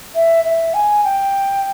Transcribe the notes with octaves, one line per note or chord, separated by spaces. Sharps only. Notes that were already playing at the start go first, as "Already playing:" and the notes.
E5
E5
G#5
G5